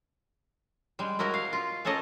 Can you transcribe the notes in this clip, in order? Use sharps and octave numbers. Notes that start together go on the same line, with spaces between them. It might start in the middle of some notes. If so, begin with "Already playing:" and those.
G3 G#3
E4 F#4 A#4 D#5
F5
F4
A3 C#4 A4 A#4 D#5